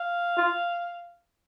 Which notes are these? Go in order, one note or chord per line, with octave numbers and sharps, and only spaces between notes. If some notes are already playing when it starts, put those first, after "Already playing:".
Already playing: F5
F4